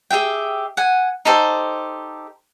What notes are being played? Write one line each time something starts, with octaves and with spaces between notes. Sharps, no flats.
G4 G#4 E5 G5
F#5 G#5
D#4 G4 A4 C5